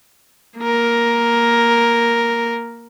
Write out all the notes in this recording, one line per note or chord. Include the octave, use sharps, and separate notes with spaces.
A#3 A#4